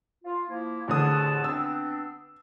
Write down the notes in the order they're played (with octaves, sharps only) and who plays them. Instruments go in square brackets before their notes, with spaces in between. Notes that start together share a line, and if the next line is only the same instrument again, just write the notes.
[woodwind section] F4
F3 A#3 E4
[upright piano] A1 D3 D#6 [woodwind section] C4 G#4 A5
[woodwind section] B3 C4 D4 [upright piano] E6